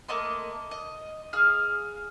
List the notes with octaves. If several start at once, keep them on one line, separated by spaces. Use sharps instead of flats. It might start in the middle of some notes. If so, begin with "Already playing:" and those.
A3 A#3 D#5 C6
D#5
G#4 F5 F6